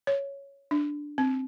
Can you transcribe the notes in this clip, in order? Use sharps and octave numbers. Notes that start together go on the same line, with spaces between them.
C#5
D4
C4